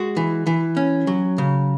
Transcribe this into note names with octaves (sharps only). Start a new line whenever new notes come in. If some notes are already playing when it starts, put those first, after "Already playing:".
Already playing: G#3 F#4
E3
E3
C#4
F#3
C#3